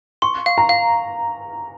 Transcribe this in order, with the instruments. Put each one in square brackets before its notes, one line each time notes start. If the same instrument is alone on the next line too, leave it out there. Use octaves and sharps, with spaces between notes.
[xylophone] C6 [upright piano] C#6
[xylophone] F5
[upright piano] A#5
[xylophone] F5